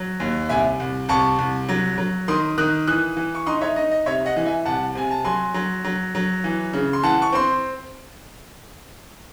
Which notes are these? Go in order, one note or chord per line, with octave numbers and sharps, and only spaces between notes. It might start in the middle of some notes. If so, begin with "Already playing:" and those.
Already playing: F#3
D#2
C2 E5 G#5
C2
C2 A5 C#6
C2
F#3
F#3
D#3 C6 D#6
D#3 D#6 F#6
E3 D#6 F#6
E3
C#6
D#4 C6 D#6
C#5 E5
D#4 D#5
D#5
C3 C#5 E5
D#5 F#5
E3
E5 G#5
C2 F#5 A5
C3 G#5
A5
F#3 G#5 C6
F#3
F#3
F#3
E3
C#3
C6
E3 F#5 A5
C#6
C4 C6